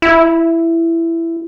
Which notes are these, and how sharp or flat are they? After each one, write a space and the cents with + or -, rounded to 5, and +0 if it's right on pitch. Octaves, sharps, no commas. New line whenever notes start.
E4 +10